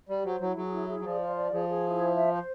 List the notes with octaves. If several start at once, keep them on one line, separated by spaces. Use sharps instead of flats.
G3 G4
F#3 C5
F#3 E4
F#3 G#4
E4
G#4
F#3
F3 D5
F4
D5
F3 G#4
G#4
E4
C5
E5
C5